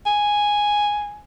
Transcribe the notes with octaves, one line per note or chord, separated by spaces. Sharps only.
G#5